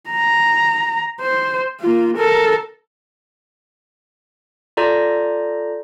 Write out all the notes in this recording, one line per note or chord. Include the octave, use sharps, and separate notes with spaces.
A#5
C5
A#3 F4
A4 A#4
F4 A4 D5 A#5 G6 A#6